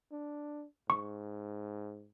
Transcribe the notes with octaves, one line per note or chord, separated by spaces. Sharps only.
D4
G#2 C#6